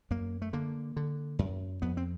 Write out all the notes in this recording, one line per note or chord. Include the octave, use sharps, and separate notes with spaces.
F#2 A#3
A3
D3 A#3
D3
F#2
F2 B3
C4